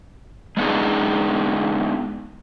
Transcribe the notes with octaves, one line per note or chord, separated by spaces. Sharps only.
G#3 B3 D4 D#4 G#4